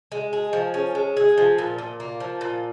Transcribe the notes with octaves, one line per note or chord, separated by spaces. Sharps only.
G#3
G#4
F3
C#4
G#3
G#4
F3
A#2
A#2
A#3
F3
A#2